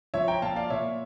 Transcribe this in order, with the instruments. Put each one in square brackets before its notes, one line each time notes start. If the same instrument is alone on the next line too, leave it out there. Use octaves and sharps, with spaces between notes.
[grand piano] F3 C#5 E5
G5 A#5
A#2 F5 A5
D5 F5
A#2 C#5 E5